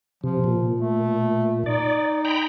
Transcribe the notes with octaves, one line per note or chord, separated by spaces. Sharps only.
C3 F3
A#2
A3
D#4 D5
G5 A#5 B5